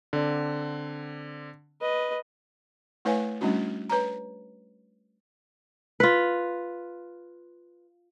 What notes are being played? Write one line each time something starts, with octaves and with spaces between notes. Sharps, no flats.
D3 C4 D5
B4 D#5
A3 E4 B4 C#5 F5 G#5
G3 A3 C#4 D4 E4 F#4
B4 C#5 A#5
F4 B4